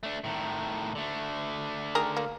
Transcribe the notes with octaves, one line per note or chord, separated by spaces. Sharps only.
A3 D4
A2 D#3
D3 A3
D#3 G#4 A#4
A#3